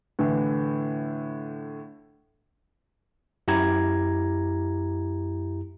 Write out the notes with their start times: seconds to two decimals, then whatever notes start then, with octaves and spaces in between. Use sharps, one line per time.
0.19 A2 D3 E3
3.48 F#2 E4 G4 A#5 G#6